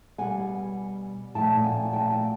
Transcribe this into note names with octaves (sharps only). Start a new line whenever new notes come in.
B2 G3 F#5 G#5
A#2 F3 A3 G5 A5
F#5 G#5
G5 A5
G5